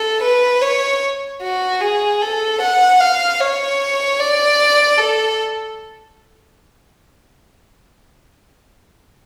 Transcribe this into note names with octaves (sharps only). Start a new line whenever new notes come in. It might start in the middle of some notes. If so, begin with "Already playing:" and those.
Already playing: A4
B4
C#5
F#4
G#4
A4
F#5
F5
C#5
D5
A4